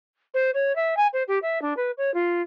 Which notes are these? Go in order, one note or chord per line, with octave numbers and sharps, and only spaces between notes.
C5
C#5
E5
G#5
C5
G4
E5
D4
B4
C#5
F4